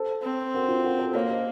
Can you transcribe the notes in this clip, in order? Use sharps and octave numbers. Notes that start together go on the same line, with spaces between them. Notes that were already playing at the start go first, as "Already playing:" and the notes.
Already playing: A4 C5
C4
F#4 A#4
F4 A4
F#4 A#4
A4 C5
A#3 A#4 C#5
C5 D#5